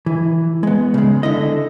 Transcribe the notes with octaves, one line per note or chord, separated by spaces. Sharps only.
E3
G#3 B3
C#3 G#3
D3 E4 D#5